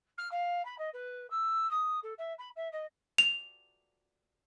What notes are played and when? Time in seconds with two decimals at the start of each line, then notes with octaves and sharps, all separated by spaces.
0.18 F6
0.31 F5
0.65 B5
0.78 D#5
0.93 B4
1.30 E6
1.70 D#6
2.03 A4
2.18 E5
2.38 B5
2.56 E5
2.72 D#5
3.18 F7